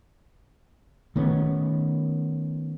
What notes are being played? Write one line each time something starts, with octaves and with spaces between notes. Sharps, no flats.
D#3 A3 B3 C#4